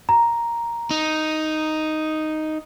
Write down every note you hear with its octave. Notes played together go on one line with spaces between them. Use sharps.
A#5
D#4